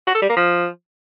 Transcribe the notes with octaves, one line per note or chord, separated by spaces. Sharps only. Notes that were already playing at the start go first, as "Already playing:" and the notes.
F#4
A4
G3
A#3
F3